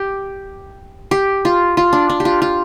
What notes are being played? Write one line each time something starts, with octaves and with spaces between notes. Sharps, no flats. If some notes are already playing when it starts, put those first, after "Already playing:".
Already playing: G4
G4
F4
F4
D4
D4
G4
F4
F4